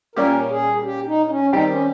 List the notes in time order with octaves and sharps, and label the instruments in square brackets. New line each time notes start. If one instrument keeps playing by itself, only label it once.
[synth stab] A#2 G3 A#3 C#4 G4 [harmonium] A#4
[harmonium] G#4
G4
D#4
D#4
C#4
[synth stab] D#3 G3 C4 G4 [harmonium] D#4
[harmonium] C#4